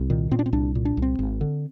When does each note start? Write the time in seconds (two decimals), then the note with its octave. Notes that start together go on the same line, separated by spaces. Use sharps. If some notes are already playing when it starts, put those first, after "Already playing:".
Already playing: C2
0.10 A#2 D#3
0.31 A#2 C4
0.39 D4
0.46 C4
0.53 C2 D4
0.75 A#2
0.85 D4
0.97 C2
1.02 C4
1.19 G#1
1.41 D3